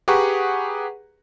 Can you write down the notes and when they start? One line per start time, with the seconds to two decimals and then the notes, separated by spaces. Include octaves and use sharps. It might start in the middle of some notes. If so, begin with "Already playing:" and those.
0.08 G4 G#4 B4 F#5 A#5 C#6